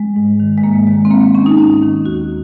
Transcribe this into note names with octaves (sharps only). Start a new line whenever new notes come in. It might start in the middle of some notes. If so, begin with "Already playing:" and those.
Already playing: G#3
G#2
D#3
G#3
G#2 A#3
D#3 G#3
C4
G#2 A#3
C4
D#3 C#4
D#4
G#2 D#4
D#3
D#2 F#4